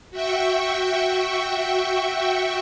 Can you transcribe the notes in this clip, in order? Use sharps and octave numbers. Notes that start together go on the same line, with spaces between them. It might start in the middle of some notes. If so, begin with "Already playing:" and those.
F#4 E5 G5 C#6